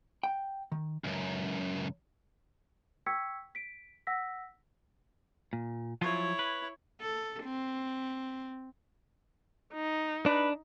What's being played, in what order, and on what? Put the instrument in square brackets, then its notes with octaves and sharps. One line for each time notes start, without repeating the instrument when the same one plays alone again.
[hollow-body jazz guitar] G5
D#3
[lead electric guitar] C#2 F#2
[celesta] G5 C#6 E6 G#6 B6 C#7
B6 D7
F#5 E6 A#6 B6
[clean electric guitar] A#2
[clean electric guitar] F3 F#3 F4 [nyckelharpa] E4 C#5
[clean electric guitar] B4
[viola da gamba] A4
C4
[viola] D#4
[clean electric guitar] D4 [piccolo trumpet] B4